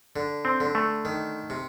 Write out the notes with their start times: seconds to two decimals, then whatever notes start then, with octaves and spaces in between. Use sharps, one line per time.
0.16 D3
0.45 C4
0.60 D3
0.75 A3
1.05 D#3
1.50 C3